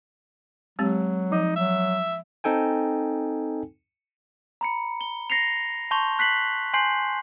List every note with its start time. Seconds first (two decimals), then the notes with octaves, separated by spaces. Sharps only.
0.79 F#3 G#3 C4 G4
1.32 F3 D#4
1.56 F#3 E5
2.44 C4 D#4 A4 G5 G#5
4.61 A#5 B5 C#7
5.01 G7
5.30 A#6 C7 C#7 F7
5.91 A5 C6 C#6 G6 F7 G7
6.19 F#6 B6 C7 F#7
6.74 G#5 C6 G6 C7 F#7